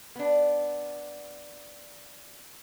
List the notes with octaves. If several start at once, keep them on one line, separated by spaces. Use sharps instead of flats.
B3 D4